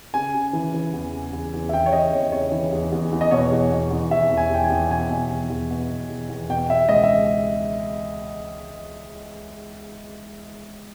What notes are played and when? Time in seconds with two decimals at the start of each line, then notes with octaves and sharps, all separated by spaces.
0.14 C#3 G#5
0.34 C#3
0.53 E3
0.74 E3
0.93 E2
1.13 C#3
1.33 E2
1.54 E2
1.69 E5
1.73 E2 G5
1.86 C#5
1.93 C#3 D#5
2.13 E2 C#5
2.32 C#3 C#5
2.52 E3
2.72 E2
2.92 E2
3.12 E2
3.21 D#5
3.31 B2 C#5
3.51 E2
3.72 B2
3.91 E2
4.11 E2 E5
4.31 E2
4.37 G#5
4.50 E2 G5
4.64 G#5
4.70 E2
4.90 B2 G#5
5.10 B2
5.30 E2
5.50 E2
5.70 B2
5.89 B2
6.09 E2
6.30 E2
6.50 B2 G5
6.69 B2 E5
6.89 C#2 D#5
7.03 E5